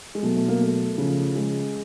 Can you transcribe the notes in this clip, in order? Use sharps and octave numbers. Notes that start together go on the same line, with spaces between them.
G#3
B2 F#3 A3
A3
A#3
A3
C#3 F3
G#3